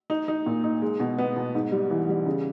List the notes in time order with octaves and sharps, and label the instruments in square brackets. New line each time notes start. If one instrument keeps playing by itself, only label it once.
[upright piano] D#4
D#4
A#2
D#4
G#3
B2
B3
B2
G#2
G3
E3
G3
C#3